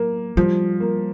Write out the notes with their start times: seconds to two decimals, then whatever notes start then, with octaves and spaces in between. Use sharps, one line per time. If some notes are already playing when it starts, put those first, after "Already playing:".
Already playing: F#3 A#3
0.37 F3 G3
0.80 A#3